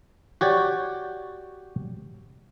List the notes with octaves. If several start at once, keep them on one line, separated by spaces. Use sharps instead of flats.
F#4 G4 C#5 D5